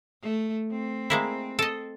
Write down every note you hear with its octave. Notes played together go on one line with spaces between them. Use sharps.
A3
C4
G#3 A#3 E4
A4 D#5